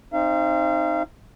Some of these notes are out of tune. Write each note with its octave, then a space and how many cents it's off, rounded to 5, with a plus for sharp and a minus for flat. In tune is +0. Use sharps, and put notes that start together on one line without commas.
C4 +20 D#4 +0 F5 -35